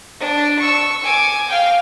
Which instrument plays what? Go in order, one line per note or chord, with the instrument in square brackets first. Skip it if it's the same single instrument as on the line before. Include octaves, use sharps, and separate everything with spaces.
[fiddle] D4
C#6 E6
G#5 D6
F5 G5